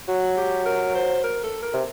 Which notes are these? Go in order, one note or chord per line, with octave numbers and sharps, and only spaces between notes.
F#3 F#4
G4
A#4
C5
A#4
A4
A#4
C3